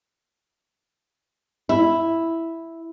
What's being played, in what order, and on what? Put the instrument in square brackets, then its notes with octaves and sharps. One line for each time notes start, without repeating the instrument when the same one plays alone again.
[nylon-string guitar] E4